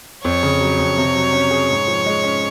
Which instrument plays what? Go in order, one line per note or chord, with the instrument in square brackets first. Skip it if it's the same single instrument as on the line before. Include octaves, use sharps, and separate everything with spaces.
[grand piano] F2 [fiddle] C#5
[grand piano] C#3
F#3
F2
C3
F#3
C#4
G#4
G#2
F3
G#3
C#4